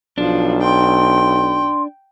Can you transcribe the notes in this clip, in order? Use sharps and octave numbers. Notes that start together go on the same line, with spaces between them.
B1 F3 D4
G5 C6